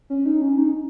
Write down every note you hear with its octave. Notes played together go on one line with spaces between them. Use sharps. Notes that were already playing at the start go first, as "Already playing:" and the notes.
C#4
D#4
C#4
D#4